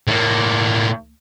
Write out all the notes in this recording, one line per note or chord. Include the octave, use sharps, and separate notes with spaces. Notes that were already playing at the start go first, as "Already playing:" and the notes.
A2 A#3